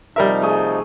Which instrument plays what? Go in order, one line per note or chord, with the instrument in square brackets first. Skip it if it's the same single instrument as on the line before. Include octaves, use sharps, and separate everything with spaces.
[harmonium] C3 F3 D#4 [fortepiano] G3 A#4 E5
[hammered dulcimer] A3 G#4